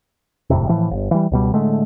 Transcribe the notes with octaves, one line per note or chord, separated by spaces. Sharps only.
E1 F2 A2 C3
A2 E3 F3
G1
E3 G3
C#2 B2 G3
A2 D3 G#3 A3